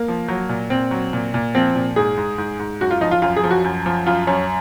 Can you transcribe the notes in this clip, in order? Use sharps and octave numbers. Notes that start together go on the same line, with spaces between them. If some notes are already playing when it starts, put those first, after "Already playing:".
Already playing: A#3
F3
F#3
A#2
A#2 C4
F#3
A#2
A#2
F3 C4
A#2
G#2 G#4
G#2
G#2
G#2
F#2 F#4
F4
F3 D#4
F4
F#2 F4
G#4
F3
F#4
F#2
F3
F#2 F4
F#2 C#4